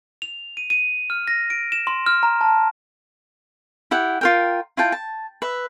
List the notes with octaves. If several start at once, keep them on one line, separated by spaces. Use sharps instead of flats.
F7
D#7
D#7
F6
A#6
D7
E7
C6
F6
A#5
A5
E4 G4 F#5 G5
F4 A#4 G5
E4 F4 G5 A5
A5
B4 E5